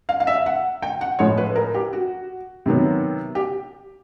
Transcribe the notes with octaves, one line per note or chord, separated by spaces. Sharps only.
F5
F5
E5
F#5
G5
F#5
A2 F3 G#3 C#5
B4
A#4
G4
F#4
C3 D#3 F#3 B3
G4